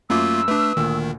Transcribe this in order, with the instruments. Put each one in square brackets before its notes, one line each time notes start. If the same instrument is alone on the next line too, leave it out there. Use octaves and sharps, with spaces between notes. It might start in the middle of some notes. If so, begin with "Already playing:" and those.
[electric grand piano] F#2 C6 D6 [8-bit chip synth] A3 A#3 F4 [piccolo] E6
[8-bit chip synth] A3 D4 [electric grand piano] B4 D6
[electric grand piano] D2 A#2 [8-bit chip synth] D#3